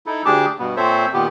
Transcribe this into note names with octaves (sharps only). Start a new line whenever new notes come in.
D#4 E4 A4
D2 D4 G4 G#4 A5 D6
G2 B2 B3
A#2 C4 A4 C5 C#5 E5
A#2 D#3 B3 G4